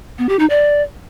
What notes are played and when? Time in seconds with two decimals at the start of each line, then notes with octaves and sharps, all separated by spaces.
0.18 B3
0.29 G4
0.39 D#4
0.50 D5